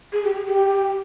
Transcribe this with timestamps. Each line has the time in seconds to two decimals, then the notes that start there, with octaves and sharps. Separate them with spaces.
0.13 G#4
0.24 G4
0.35 G#4
0.46 G4